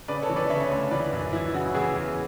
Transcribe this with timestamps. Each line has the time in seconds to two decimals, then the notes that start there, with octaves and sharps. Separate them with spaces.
0.08 C#3 B4 D5
0.22 A4 C#5
0.29 E3
0.36 B4 D5
0.50 C#3 C#5 E5
0.71 D2
0.91 E3 B4 D5
1.13 F#2
1.33 E3 E4
1.54 C#3 F#4
1.74 E3 E4 G#4
1.95 E2